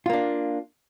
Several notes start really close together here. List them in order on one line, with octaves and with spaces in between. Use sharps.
F4 A#3 D4